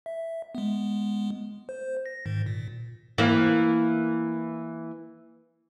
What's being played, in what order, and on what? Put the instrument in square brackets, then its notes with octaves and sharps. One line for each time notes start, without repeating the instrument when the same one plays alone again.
[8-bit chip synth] E5
G#3 B3
C5
A#6
G#2 D#3
A#2
[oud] E3 A#3